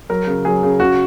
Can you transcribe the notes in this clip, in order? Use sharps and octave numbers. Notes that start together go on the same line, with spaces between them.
F#3 A#4
C#3
F#3 G#4
C#3
C#3 F#4